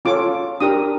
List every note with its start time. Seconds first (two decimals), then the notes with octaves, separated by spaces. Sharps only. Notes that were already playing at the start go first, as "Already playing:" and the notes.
0.05 C#4 F4 A4 C#5 D6
0.60 D4 G4 A#4 D#6